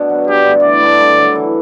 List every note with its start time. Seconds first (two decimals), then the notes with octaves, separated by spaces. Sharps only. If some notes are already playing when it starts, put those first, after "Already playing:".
Already playing: B2 D4 F#4
0.09 F#3 B3
0.28 G2 G4
0.45 D3 A3
0.63 E3 D5
0.82 B3 D4 A4
1.00 G2
1.17 D3 F#3
1.35 E3